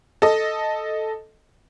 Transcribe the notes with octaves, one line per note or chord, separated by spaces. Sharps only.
A4 D#5